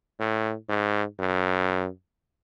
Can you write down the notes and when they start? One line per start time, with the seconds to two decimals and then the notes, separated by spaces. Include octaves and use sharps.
0.20 A2
0.69 G#2
1.19 F#2